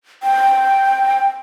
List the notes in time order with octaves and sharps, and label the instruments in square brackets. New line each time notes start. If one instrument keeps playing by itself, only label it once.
[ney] G5